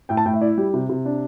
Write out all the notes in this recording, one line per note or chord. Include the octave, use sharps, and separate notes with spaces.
A2 G5
A5
A2 G5
E5
E4 D5
G3 G4
C3
C3
D4